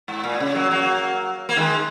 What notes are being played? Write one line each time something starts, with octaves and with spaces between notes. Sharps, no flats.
G#2
A#2
C#3
F#3 A#3
F#3 A#3
A#3
D#3 G#3